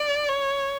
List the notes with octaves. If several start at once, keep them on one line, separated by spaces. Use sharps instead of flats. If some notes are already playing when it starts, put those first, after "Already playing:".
Already playing: D5
C#5